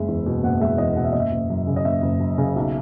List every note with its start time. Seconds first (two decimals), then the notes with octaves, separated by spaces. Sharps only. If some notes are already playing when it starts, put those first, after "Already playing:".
Already playing: F#1 G#3 E5
0.08 E2
0.26 B2
0.43 F#1 F#5
0.61 G#3 E5
0.78 E2 D#5
0.96 B2 F#5
1.04 E5
1.13 F#1 D#5
1.20 E5
1.32 F#1
1.50 F#2
1.67 C#3
1.76 D#5
1.85 F#1 E5
2.02 F#1
2.20 F#2
2.38 C#3
2.56 B1